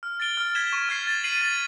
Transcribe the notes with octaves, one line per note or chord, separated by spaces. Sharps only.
F6
A6 D7 G7
F6
G#6 B6 E7 G7
C#6
F6 G#6 C7
A6
C7 D#7 F#7
A6